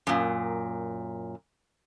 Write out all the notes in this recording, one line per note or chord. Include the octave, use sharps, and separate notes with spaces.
F#2 A#2